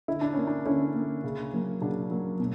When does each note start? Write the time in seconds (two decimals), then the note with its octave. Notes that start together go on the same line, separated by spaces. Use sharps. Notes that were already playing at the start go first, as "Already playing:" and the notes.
0.08 D3 E4
0.21 D4
0.33 A#3 C#4
0.47 D4
0.66 D3 C#4 E4
0.95 A#3
1.24 C#3
1.53 F#3 A#3
1.81 C#3 D4 F#4
2.11 F#3 A#3
2.40 B2